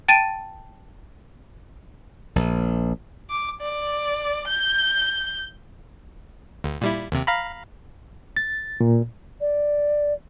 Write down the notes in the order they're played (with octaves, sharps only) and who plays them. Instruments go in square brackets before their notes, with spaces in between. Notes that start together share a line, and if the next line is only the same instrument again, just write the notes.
[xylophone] G5 A5 A6 D7 D#7
[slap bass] A#1
[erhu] D6
D5
G6
[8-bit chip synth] D2
A#2 G3 E4
D#2 C3
F5 A#5 B5
[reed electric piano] A6
A#2
[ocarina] D5